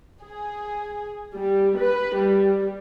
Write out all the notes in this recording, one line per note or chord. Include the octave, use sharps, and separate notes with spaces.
G#4
G3
B4
G3